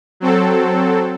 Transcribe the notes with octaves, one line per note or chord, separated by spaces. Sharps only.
F#3 C4 A4